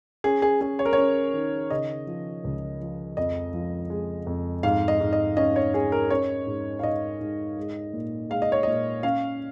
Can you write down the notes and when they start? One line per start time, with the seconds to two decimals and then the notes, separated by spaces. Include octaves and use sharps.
0.24 C#4 G#4
0.42 G#4
0.61 C#4 G#4
0.79 C#5
0.85 A#4
0.93 C#5
0.98 C#4
1.33 D#3
1.70 C#3 D#5
2.07 F3
2.44 C#2
2.81 F3
3.17 F2 D#5
3.53 F3
3.90 G#3
4.27 F2
4.63 G#2 F5
4.88 D#5
5.00 G#2
5.13 D#5
5.37 C#4 D#5
5.56 C#5
5.74 C#4 G#4
5.92 A#4
6.10 C#4 C#5
6.47 G#2
6.79 F5
6.83 G#2 D#5
7.20 G#2
7.57 G#3
7.94 A#2
8.30 G#3 F5
8.42 D#5
8.52 C#5
8.63 A#2 D#5
9.03 C#4 F5